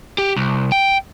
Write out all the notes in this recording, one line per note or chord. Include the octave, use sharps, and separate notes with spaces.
G4
C2
G5